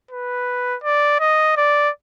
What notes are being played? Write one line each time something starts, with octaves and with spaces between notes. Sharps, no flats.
B4
D5
D#5
D5